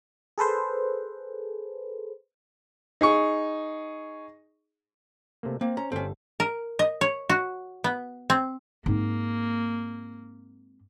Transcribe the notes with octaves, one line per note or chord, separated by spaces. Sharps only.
G#4 A4 B4 C5
D#4 G#4 C#6
C3 A3 A#3
A#3 C4
C#4 C5 A#5
G1 G3 C4 C#4 A4
A#4
D#5
C#5
F#4
B3
C4
G#2 A#3 C4